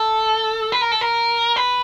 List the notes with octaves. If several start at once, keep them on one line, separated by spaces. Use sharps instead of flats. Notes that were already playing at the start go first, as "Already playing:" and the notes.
Already playing: A4
B4
A#4
A4
A#4
B4